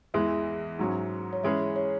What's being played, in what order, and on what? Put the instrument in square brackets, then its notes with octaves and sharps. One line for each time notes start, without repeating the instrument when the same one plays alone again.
[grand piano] E2 E3 G#3 [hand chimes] E5
[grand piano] G#2 F#3 C#4
[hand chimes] C#5
[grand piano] E3 G#3 C#4 G#4 B4 [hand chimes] E5
[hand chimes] C#5